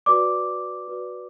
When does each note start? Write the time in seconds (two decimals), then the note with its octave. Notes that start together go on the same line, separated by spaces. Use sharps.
0.06 F#4 B4 D5 D6
0.88 F#4 B4 D5